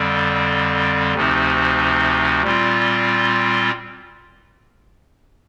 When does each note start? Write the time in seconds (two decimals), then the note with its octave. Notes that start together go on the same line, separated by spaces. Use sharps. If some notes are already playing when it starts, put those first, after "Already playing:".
Already playing: F2 D3 G3 C4
1.14 D2 C3 F3 C4 D#4
2.42 A#2 G3 C4 F4